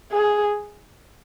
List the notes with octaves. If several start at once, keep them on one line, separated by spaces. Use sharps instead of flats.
G#4